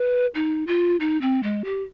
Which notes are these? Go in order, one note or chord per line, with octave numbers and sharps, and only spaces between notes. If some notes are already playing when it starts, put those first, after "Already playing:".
Already playing: B4
D#4
F4
D#4
C4
G#3
G4